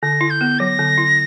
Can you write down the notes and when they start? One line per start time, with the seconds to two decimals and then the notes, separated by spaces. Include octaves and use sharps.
0.02 D3 A#6
0.21 E4
0.30 G6
0.41 B3
0.59 F#3 A#6
0.79 D3
0.98 E4